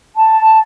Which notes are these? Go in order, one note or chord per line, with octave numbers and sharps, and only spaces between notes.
A5